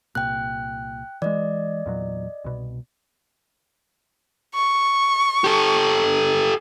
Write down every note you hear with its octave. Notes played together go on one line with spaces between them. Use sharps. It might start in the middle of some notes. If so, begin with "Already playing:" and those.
C2 A#2 G5 F#6
E3 G#3 D5 D#5
E2 A#2 F#3
C2 B2
C#6
G4 A4